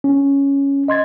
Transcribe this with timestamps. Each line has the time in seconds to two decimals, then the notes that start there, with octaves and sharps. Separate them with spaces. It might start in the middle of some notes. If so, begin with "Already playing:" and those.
0.04 C#4
0.88 D#5 C6 G#6 A6